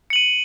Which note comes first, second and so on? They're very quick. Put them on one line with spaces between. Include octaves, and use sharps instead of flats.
C#7 F#7 D#7